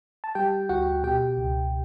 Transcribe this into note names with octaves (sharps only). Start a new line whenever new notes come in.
A5
G3 G4 G5
D2 F#4 F#5
B2 G4 G5
C#2